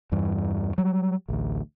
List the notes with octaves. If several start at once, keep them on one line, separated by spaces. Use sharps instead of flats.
E2 G2 E3
F#3 G3
A1 D2